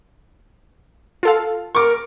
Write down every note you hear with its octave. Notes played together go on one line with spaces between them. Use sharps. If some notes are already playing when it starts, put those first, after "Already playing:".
F4 A4 F5
A#4 C#6 D6